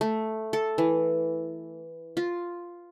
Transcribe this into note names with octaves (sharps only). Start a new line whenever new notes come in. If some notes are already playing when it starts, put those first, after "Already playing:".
A3
A4
E3
F4